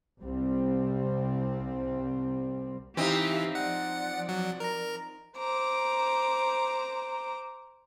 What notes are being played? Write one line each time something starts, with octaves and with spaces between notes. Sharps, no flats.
C2 G3 C4
E3 C4 D#4 G4 E5 F5
F3 D5 F#5
F#3 F#5
A#4 A#5
C5 A#5 D6